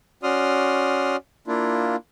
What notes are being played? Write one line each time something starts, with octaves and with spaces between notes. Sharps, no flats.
C#4 F#4 D5 C6 D#6 F6
A#3 D4 E4 F4